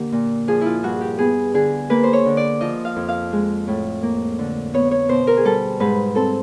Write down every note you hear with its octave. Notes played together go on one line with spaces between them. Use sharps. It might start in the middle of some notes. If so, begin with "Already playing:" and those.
Already playing: D3 A#3 G4
A#2
F3 G#4
E4 F4
G2 F#4
G4
B3 G#4
D3 G#4
A#3 B4
C5
C#5
D3
D5
F3 D#5
F5
F2
F5
G#3
A2
A#3
D3
B3 C#5
C#5
B2 C5
A#4
G#4
G3 A4
G#2 B4
C4 A4